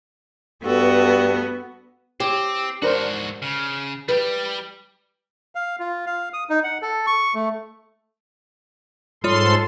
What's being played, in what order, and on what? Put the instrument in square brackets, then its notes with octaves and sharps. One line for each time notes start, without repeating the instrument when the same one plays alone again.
[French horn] G2 [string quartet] B3 F#4 [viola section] A4
[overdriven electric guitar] C4 [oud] G4 [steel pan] C#5
[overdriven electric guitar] G#2 F#4 [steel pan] D4 A#4 C5
[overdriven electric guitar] C#3
[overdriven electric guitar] G3 G4 [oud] B4
[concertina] F5
F4
F5
D#6
D#4
F#5
A4
C#6
A3
[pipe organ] G#2 A4 C6 [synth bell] G3 F4 C#5